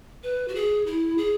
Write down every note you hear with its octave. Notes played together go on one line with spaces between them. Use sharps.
B4
F#4
G#4
E4
G#4